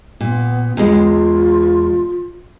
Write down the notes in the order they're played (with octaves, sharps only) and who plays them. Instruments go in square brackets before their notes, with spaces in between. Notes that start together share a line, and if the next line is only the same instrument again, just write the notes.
[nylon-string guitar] A#2 [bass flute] B3
[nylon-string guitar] E2 G#3 [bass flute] F4